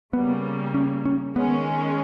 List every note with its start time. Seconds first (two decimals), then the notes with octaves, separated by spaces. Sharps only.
0.13 C#3 G3 A#3 B3
0.74 C#4
1.05 C#4
1.36 D#3 G#3 B3 C#4